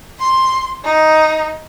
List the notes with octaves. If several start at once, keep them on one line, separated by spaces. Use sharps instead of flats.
C6
D#4